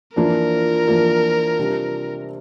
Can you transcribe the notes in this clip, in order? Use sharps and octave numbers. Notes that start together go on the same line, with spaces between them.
F2 E3 A#3 D4 F4 A#4
F2 E3 A#3 D4 F4
C3 G3 D4 F4